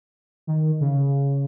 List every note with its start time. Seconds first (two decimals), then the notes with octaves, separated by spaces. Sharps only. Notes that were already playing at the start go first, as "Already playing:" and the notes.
0.47 D#3
0.80 C#3